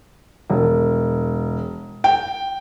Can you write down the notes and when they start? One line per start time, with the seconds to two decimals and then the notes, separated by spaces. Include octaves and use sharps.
0.50 E1
2.04 G5